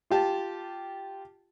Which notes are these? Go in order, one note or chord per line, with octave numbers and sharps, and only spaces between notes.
F4 G4 A5